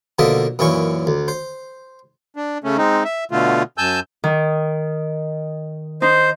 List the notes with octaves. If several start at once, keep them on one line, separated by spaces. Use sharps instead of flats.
B2 D3 F3 A#3 D#5 E5
F#2 A#2 E3 C#4 C#6
D2
C5
D4
C#3 A3 C#4
G#3 C4 D#4
E5
B2 D3 A3 F4
F#2 G#5 A5 E6 G6
D#3
D#4 C5